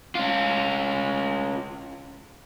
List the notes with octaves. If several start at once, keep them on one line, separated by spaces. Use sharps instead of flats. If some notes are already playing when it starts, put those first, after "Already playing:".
C#4 F4